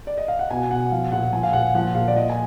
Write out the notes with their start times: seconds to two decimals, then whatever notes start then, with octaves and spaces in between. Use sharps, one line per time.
0.07 D5
0.18 D#5
0.28 F5
0.39 F#5
0.51 B2 G#5
0.70 B2 F#5
0.92 F3 F5
1.12 A#2 F#5
1.33 F3 G#5
1.43 F5
1.53 A#2 F#5
1.75 F3 F#5
1.95 A#2 F5
2.08 D5
2.16 F3 D#5
2.30 G#5